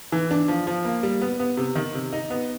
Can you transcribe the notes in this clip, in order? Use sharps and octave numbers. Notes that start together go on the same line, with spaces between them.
E3
D4
F3
F3
A#3
G3
B3
B3
C3
D#3
C3
D#4
B3